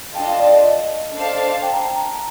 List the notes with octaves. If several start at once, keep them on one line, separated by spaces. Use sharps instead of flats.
D4 F4 A4 D#5 G5 A5
F5
D5
D#5
D#5
D4 A4 C5 F5 A5
G5
A#5
A5
A#5